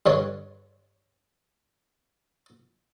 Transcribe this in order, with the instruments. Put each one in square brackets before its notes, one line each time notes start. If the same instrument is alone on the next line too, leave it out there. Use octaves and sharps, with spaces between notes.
[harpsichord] G2 D3 C#5